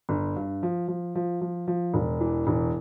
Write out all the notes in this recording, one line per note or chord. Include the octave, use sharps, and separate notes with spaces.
G1
G2
F3
F3
F3
F3
F3
E1
E3
E1